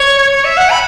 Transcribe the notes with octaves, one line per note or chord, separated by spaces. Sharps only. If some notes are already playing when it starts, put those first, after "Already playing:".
Already playing: C#5
C#5
E5
F#5
B5